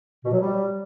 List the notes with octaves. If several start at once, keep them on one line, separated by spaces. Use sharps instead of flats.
B2
F#3
G3